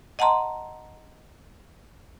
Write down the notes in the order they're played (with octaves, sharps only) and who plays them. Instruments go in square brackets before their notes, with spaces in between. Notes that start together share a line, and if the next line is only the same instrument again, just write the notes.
[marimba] D#5 F#5 A5 A#5 C6